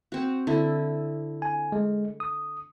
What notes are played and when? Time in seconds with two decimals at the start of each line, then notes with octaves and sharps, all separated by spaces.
0.12 C4 F#4
0.47 D3 E4 D#5
1.42 G#5
1.72 G#3
2.20 D#6